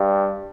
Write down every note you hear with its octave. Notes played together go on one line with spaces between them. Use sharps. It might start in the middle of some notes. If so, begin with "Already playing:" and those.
Already playing: G2